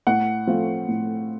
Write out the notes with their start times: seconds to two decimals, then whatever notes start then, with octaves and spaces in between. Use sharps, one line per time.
0.07 A2 F#5
0.47 F3 A3 C4 F4
0.88 A2